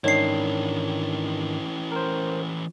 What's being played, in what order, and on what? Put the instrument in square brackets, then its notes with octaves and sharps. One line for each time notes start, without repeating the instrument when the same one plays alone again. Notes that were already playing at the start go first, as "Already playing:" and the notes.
[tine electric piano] G#2 D#3 D4 [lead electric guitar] E3 C#4 [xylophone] C#5 C7
[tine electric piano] A#4 C5